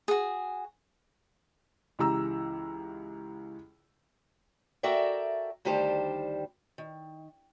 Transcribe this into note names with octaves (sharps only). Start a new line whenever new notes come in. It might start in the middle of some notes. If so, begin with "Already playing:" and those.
F#4 G#4
C#2 E3 G4 A#5 E6
F#4 A4 A#4 D5 E5 G5
D2 D#3 G3 G4 C5 A5
D#3